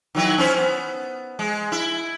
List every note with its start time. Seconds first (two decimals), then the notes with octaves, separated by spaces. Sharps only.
0.15 D#3 F#3 E4
0.38 C#4 E4 C5
0.57 B3
1.39 G#3
1.72 E4